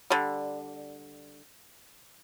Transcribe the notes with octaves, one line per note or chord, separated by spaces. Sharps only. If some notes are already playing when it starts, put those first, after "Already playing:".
D3 G3